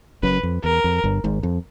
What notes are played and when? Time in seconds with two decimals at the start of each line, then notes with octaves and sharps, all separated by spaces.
0.23 F#1 F#2 B4
0.43 F2
0.64 E2 A#4
0.84 F2
1.04 G1 G2
1.24 G#1 G#2
1.43 F2